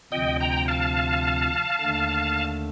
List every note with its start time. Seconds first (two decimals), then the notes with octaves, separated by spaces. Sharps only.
0.12 D2 C3 F3 D#5 G5
0.40 G5 A#5
0.68 F5 A5
1.81 D#2 D3 A3